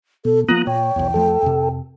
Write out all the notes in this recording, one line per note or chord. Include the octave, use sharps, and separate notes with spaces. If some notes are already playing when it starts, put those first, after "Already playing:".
B2 A4
F3 A#3 B3 F4 A#5 D#6 F#6
A#2 C#5 G5
B1 E2
F2 F3 A3 A4
F2 C3